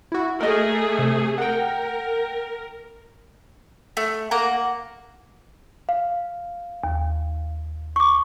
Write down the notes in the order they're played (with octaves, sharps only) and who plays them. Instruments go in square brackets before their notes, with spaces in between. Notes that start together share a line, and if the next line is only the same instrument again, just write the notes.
[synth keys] E4 F#4
[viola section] A3 G#4 [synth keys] A#4 D#5
[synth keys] C3
[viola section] A#4 [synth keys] F#5 G5
[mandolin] A3
A#3 F#5 A#5
[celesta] F5
[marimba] D#2
[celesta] C#6 D6